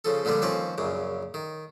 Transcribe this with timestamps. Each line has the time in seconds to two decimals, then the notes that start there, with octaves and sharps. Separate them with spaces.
0.05 C#3 F3 A4
0.25 A#2 D3 F3 G3 B3
0.42 D#2 F3 C4 C#4 B4
0.78 A#1 F#2 C#3
1.34 D#3